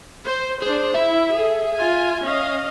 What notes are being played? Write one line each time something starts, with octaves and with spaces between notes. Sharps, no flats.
C5
D4 G#4 C5
E4 E5
G#4 A4
F4 G#5
C#4 D#5 F5